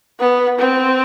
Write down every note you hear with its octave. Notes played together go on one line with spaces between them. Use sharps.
B3
C4